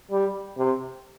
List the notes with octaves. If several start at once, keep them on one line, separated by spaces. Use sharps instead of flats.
G3
C3